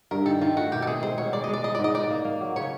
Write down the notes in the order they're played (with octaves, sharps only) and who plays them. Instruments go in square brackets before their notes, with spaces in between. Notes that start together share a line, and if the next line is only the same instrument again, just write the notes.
[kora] G2 [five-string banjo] A#4
[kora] D#3 [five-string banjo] A4
[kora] D#3 [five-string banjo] F4
[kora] A3 [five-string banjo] F#4
[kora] B2 [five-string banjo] G4
[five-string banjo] A4
[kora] C4 [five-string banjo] G#4
[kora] G#3 [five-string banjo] C5
[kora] B2 [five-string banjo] C#5
[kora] G#3 [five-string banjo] D5
[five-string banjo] D#5
[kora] G#3 [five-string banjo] D5
[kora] G#3 [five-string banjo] D#5
[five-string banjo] D5
[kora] G#2 [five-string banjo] D#5
[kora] D#4 [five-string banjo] D5
[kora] A#3
A#3
F#3
[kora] C#3 [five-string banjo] C#5